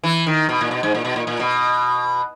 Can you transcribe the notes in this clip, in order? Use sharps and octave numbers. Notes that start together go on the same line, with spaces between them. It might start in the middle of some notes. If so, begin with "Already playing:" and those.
E3
D#3
B2
A#2
B2
G#2
A#2
B2
A#2
A#2
B2